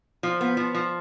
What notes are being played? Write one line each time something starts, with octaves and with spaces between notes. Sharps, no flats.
F3
B3
F3
F3